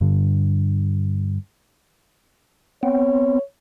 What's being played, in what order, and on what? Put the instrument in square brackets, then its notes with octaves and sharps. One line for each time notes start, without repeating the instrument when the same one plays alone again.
[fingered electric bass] G2 D3
[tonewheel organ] B3 C4 [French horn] C#5